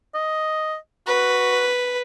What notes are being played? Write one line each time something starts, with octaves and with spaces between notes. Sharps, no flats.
D#5
F#4 B4